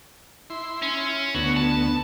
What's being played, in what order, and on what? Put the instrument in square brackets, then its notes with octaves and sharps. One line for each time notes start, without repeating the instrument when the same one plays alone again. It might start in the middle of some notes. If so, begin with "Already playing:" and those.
[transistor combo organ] E4 C6
[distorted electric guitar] C#4
[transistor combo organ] D2 B3 [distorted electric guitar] F#4
[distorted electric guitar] A5